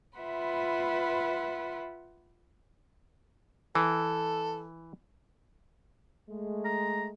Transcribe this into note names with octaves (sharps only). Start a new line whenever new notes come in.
F4 B4 E5 F#5 B5 C6
E3 A4
G#3 A3
A#5